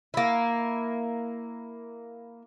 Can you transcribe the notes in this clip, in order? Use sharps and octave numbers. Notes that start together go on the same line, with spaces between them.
A#3 E4